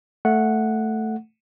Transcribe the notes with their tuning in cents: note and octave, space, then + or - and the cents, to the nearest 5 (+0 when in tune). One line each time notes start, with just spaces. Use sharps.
A3 +0 F#5 -5